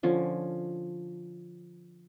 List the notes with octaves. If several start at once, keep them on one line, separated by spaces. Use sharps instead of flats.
D3 F3 C#4